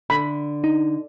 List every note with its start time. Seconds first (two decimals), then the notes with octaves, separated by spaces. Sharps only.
0.10 D3 B5
0.64 D#4